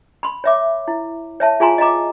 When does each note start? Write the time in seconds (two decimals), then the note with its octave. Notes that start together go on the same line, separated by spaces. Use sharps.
0.23 B5 C6
0.44 C#5 E5 D6
0.88 E4
1.40 C#5 E5 A5
1.60 F4 G#4 F5 G#5 A#5 C6
1.78 D#5 F5 A#5 D6